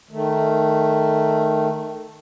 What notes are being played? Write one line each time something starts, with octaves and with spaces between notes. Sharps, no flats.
D#3 A3